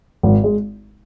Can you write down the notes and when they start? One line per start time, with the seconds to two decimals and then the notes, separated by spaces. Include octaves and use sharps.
0.23 G#1
0.44 G#3